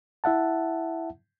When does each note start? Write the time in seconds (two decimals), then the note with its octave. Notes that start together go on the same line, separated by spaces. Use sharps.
0.24 E4 E5 F#5 A5